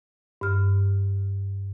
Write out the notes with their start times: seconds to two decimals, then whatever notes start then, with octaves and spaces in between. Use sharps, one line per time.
0.41 G2 F6